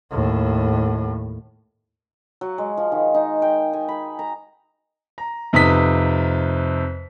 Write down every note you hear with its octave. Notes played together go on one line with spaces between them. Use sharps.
D#2 A2
F#3
G#3
F3
D#3
D#4
G5
G#5
B5
A#5
A#5
F2 C3 D#4 B4 D#6 B6